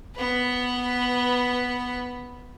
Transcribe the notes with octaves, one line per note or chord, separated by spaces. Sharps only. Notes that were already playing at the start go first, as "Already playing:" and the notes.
B3 B4